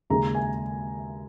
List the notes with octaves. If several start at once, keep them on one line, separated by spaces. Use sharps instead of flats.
D#2 C#3 G#3 A#5
G#5